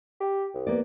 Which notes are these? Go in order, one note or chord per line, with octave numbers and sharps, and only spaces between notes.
G4
C2
A#3 B3 D5